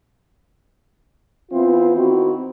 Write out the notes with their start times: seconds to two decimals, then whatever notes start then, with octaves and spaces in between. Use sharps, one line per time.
1.52 E3 B3 C4 F4
1.97 D#3 C4 E4 F#4